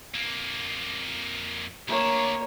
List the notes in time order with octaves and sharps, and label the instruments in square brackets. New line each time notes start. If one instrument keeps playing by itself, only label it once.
[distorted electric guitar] F2 A#3
[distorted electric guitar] D2 D4 [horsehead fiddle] A#3 C#5